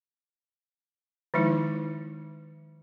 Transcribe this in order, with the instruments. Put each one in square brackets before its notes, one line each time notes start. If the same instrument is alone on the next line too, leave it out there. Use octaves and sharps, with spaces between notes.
[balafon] D#3 F3 G#3 D#4 E4